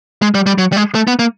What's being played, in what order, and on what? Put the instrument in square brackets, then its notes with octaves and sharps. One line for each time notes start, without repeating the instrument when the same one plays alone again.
[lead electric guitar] G#3
G3
G3
F#3
G3
G#3
A3
B3
A#3